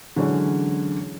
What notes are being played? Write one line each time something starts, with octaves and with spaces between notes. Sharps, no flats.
D3 E3 F#3 G#3 C#4